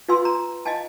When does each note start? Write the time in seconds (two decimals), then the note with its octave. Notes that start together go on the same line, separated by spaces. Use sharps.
0.09 F4 B4 F5 G#5 C6 E6
0.25 A#5
0.66 D#5 F5 G#5 A5